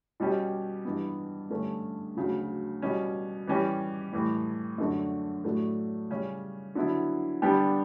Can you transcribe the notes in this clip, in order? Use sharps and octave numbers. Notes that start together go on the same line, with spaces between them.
B2 G3 C#4 G4
G2 E3 B3
G2 D3 A3 C#4
D2 C#3 F#3
B2 G3 C#4
E3 G3 C#4 G4
A2 E3 G3
F#2 D3 A3 D4 F#4
A2 F#3 A3 D4
C#3 G3 C#4
D3 F#3 B3 E4
D3 G3 B3 D4 G4